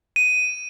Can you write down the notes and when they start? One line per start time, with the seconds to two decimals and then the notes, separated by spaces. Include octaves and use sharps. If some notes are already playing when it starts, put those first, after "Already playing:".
0.16 D#7